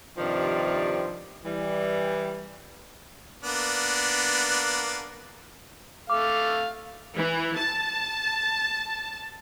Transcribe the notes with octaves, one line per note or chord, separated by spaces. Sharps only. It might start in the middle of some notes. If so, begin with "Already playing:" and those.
G2 C3 D#3 F3 D5
E3 G3
A#3 B3 D4
A3 F5 D6
E3
A5